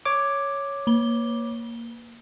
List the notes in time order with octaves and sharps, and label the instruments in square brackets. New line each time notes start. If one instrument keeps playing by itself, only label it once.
[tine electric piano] C#5 D6
[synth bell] A#3 G7